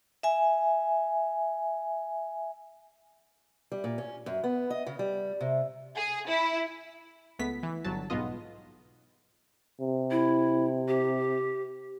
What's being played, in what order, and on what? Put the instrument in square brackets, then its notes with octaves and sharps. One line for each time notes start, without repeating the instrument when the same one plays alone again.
[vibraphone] E5 G#5
[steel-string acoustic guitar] G3
A#2
C#4
F#2
B3
D#5
C#3
G3
C3
[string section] G#4
E4
[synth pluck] C#2 A3 B3 B6
E3
G1 F#3 A5
B1 G#2 B3 F4 D#5
[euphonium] C3
[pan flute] E4
G4